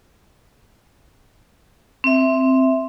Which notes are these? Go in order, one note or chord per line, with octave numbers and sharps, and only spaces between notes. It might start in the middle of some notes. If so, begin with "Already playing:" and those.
C4 E5